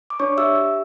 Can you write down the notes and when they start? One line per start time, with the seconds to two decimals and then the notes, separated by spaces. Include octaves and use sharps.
0.10 D6
0.20 D4 C#5 C#6
0.37 G4 E5 E6
0.55 G4